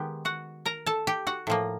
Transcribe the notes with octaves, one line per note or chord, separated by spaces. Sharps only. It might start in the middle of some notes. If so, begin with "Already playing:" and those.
Already playing: D#3 G#3 B3 G4 G5
F#4 F#5
A#4 A#5
A4 A5
G4 G5
F#4 F#5
A2 F3 A#3